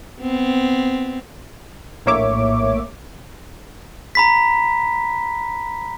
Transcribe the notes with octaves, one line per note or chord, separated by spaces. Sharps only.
B3 C4
A#1 A2 A#3 C#5 E5 D6
A#5 B5 B6